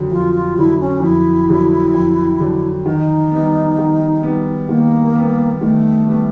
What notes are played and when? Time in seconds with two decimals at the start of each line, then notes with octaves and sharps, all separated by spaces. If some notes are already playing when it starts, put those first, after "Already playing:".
Already playing: F2 D3 F#3
0.11 F2 F4
0.34 F4
0.57 D3 F#3 E4
0.80 C#4
1.02 F2 E4
1.49 D3 F#3
1.94 F2
2.40 D3 F#3
2.86 D#3 D#4
3.32 G3 B3
3.78 D#3
4.23 G3 B3
4.69 D#3 A#3
5.15 G3 B3
5.61 D#3 A3
6.07 G3 B3